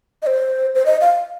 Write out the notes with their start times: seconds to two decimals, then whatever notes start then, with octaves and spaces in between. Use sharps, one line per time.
0.22 D#5
0.27 C5
0.75 C5
0.86 D#5
1.01 F5